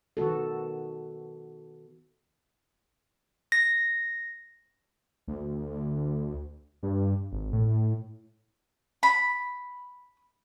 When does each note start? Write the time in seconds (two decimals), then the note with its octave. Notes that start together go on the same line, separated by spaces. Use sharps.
0.17 D#3 B3 F#4 A4
3.52 A#6
5.28 D2
6.83 G2
7.32 G#1
7.53 A2
9.03 B5